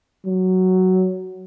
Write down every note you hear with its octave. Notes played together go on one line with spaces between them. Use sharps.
F#3